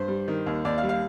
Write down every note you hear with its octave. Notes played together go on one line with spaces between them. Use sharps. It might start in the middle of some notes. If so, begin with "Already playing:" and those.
Already playing: G2 C5
G3
D#3
D#2
D#2 D5
F5
G3
F5